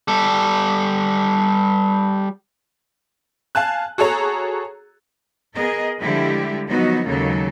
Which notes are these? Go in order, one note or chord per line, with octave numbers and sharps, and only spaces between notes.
G3 A4
F5 G#5 A5 F#6
F#4 G#4 A4 C#5 A#5
B3 G#4 A#4 D#5
D3 F3 G3 G#3 E4 G4
F3 F#3 B3 D#4 F#4 D#5
D#2 C#3 F#3 G#3 A#3 A4